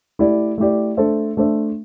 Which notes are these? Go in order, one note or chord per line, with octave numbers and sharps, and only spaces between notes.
A3 E4 G4 D5
A3 E4 G4 D5
A3 D4 A4 C5 E5
A3 D4 A4 C5 E5